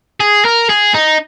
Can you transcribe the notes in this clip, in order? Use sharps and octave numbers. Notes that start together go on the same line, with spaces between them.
G#4
A#4
G#4
D#4